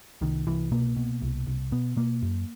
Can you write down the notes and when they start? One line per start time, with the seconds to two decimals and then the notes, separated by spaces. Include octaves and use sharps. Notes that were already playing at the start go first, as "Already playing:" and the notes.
0.21 C2 D#3
0.47 C2 E3
0.72 B2 A#3
0.96 B2
1.22 C2
1.47 C2
1.72 B2 B3
1.97 B2 A#3
2.22 F#2